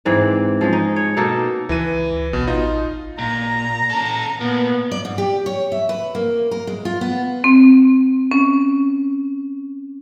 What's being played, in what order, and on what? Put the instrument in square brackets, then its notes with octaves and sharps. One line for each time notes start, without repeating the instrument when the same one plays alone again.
[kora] G#2 E3 C4 D5
F3 G#3 C#4
D#4
C#5
B2 A#3 D#4 A4
[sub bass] C#2 [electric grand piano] E3 B4 D#7
[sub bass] A1 [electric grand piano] B2
[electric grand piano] D#4 F4 D#5
[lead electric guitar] A#2 [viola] A#5
[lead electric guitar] C#4 A4
[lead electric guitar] A#2 [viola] B3
[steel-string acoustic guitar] D5
G#2
G4
C#5
E5
B4
A#3
A#4
G#3
F4
B3
[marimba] C4
C#4